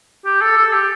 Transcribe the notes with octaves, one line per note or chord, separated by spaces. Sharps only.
G4
A4
A4
G4